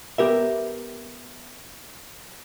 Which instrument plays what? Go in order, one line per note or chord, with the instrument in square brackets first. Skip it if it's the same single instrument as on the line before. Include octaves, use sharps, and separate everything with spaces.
[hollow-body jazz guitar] B3 G4 A#4 E5